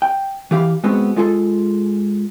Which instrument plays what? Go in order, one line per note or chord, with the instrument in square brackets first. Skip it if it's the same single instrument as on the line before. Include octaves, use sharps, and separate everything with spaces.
[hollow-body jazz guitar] G5
E3 G4 F5 B5
G#3 B3 C4 F#4
G#3 F4 G#4 A4